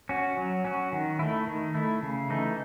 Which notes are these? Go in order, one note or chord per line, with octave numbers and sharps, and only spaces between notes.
C#4 F#4
F#3
C#4 F#4
D#3
A3 E4
D#3
A3 E4
C#3
E3 A3 D#4